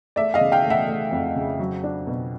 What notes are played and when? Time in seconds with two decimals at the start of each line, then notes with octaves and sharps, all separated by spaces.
0.16 A3 D5 E5
0.34 D#5 F5
0.41 C#3
0.52 F5 G5
0.65 A3
0.70 E5 F#5
0.88 A3
1.11 F2
1.36 C#3
1.59 F#3
1.84 D4
2.07 B2